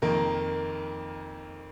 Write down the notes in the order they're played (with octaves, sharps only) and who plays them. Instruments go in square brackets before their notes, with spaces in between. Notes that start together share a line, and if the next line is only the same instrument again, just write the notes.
[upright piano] F2 D#3 A#3 A#4